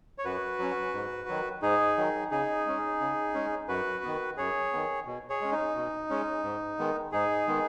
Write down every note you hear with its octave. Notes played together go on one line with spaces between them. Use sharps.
C#5
F#2 F#4 B4
F#3 C#4
G#2
D#3 F#3
G#2 D#4 G#4
D#3 F#3
C#3 D#4 G#4
G#3 C#4
C#3
G#3 C#4
F#2 F#4 B4
D#3 B3
F#2 G#4 C#5
D#3 B3
B2
G#4 C#5
G#3 C#4
D#4
B2
G#3 C#4
G#2
D#3 G#3 B3
G#2 D#4 G#4
D#3 G#3 B3